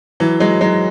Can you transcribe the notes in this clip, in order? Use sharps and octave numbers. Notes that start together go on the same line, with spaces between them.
E3 F#3
F#3 G#3
F#3 G#3